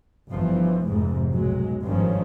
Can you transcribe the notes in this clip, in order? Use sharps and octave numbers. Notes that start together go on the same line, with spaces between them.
G1 E3 F3
F1 F2 G#2
B1 F#3 G#3
G#1 G2 D#3 F3 C#4